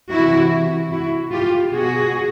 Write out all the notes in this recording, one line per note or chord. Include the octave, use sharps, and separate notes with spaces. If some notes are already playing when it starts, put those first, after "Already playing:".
C3 E3 E4 F#4
E4 F#4
F4 G4
B2 F#4 G#4